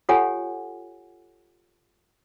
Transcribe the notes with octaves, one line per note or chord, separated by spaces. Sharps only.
F4 G4 A4 C#5 F#5 G#5